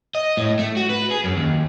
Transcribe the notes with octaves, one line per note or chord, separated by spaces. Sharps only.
D#5
A2
A3
F#4
B4
G#4
F#2
D#2